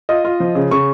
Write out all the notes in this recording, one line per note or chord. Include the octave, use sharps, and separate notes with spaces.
F4 D#5
F4
F3
C#3
C#3 C#6